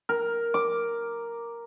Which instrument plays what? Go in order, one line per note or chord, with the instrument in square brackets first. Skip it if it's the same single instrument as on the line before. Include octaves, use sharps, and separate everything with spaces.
[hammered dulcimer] A#4
D6